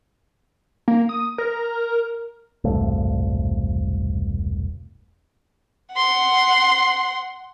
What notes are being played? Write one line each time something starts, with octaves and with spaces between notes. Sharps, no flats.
A#3
D#6
A#4
E1 C2 G2 A3
F#5 C6